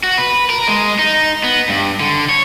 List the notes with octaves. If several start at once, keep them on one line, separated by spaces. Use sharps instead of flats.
F#4
B4
A#4
G#3
D#4
B3
G2
D3
C#5